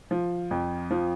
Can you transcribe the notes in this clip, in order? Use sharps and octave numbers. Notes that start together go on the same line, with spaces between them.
F3
F2
F3